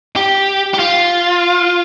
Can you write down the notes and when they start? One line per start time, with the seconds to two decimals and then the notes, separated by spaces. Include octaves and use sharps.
0.16 G4
0.74 G4
0.79 F4